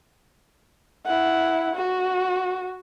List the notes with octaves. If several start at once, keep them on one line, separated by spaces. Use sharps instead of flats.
E4 F#5
F#4